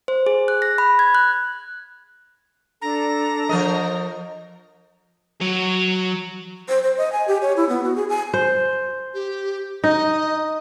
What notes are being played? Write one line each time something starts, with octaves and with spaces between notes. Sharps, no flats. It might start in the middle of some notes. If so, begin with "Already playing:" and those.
C5
G#4
F#6
A#6
B5
G#6
F#6
D4 A4 A#5
F3 A#4 D#5
F#3 C#5
C5
C5
D#5
G#5
G4
C#5
E4
B3
F#4
G#4
G#5
C5
G4
D#4 D#5